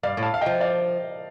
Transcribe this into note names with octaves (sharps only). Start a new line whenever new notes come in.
G2 D5 F5
A2
F5 A5
F5
F3 D#5 G5
D5 F5